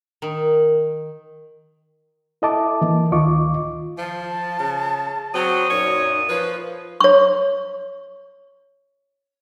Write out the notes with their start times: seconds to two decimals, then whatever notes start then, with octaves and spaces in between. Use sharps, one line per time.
0.22 D#3
2.42 E4 A4 D#5 E5 A5 D6
2.82 E3 A#3
3.12 D2 D#3 F4 D#5 C#6 D6
3.98 F3 A5
4.59 C#3
5.34 F#3 C4 D#6
5.70 F#2 A#2 D#4 C#5
6.29 F3 B4 C#5
7.00 C#5 C#6